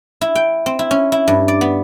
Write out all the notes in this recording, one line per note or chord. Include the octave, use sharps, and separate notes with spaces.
E4
G5
C4
E4
C#4
E4
G2
D5
B3